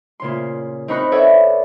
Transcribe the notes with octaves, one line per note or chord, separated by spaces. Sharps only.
A#2 C#3 C6
C4 D#4 A#4 B5 C#6 F#6
A4 B4 C#5 D5 E5 F#5